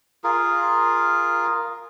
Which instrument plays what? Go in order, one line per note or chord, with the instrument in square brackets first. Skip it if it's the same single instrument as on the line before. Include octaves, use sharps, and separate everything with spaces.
[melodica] F4 G#4 A#4